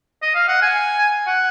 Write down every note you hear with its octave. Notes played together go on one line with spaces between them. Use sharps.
D#5
F5
F#5
G#5
F#5